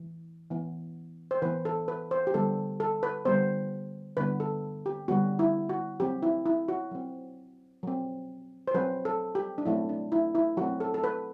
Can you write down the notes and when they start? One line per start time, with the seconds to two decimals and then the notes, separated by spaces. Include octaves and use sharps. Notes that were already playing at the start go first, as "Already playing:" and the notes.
Already playing: E3
0.51 E3 B3
1.31 C5
1.42 E3 B3 B4
1.65 A4
1.88 B4
2.11 C5
2.27 G4
2.34 D3 G3 B3 A4
2.80 A4
3.03 B4
3.25 D3 G3 B3 C5
4.17 D3 G3 B3 B4
4.40 A4
4.86 G4
5.08 D3 G3 B3 F#4
5.39 E4
5.69 F#4
6.00 F#3 C4 G4
6.23 E4
6.46 E4
6.68 F#4
6.91 F#3 C4
7.83 F#3 C4
8.68 C5
8.74 F#3 C4 B4
9.05 A4
9.35 G4
9.58 D4
9.65 F#3 A3 C4 E4
9.89 D4
10.12 E4
10.35 E4
10.57 F#3 A3 C4 F#4
10.80 A4
10.94 A4
11.04 B4